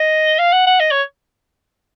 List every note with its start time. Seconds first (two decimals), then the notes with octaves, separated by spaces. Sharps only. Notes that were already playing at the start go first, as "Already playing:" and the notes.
Already playing: D#5
0.39 F5
0.52 F#5
0.66 F#5
0.80 D#5
0.91 C#5